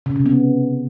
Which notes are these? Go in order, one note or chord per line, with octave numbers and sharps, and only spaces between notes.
C#3
C3
B3